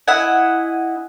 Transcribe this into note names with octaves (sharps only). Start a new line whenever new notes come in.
E4 D#5 F#5 G#5